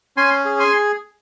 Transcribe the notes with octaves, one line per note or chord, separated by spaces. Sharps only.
C#4 G#5 C6
G#4
G#5 C6